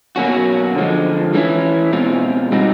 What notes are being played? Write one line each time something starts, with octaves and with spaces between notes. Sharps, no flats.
B2 F#3 A#3 C#4 F#4
D3 F3 G#3
E3 G3 A#3 C#4 E4
B2 G#3 C4 F4
G3 C4 D#4 F#4